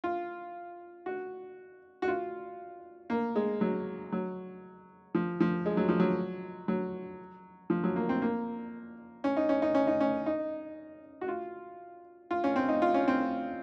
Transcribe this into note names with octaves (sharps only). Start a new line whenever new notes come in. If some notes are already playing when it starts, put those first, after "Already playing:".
F4
F#4
F#4
F4
A#3
G#3
F#3
F#3
F3
F3
G#3
F#3
F3
F#3
F#3
F3
F#3
A#3
C4
A#3
C#4
D#4
C#4
D#4
C#4
D#4
C#4
D#4
F#4
F4
F4
C#4
C4
D#4
F4
C#4
C4